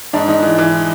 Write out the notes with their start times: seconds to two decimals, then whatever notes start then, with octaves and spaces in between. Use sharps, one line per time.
0.13 G#2 D4
0.28 G#2 D#4
0.43 E3
0.58 E3